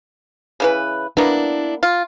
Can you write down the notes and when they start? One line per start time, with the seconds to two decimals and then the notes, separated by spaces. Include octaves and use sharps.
0.60 C#3 E3 B4
1.17 A#3 B3 D4 E4
1.83 F4